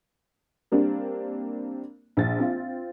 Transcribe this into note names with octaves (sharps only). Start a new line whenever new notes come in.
G3 A#3 C4 D4
A#1 C5 A6
C4 F4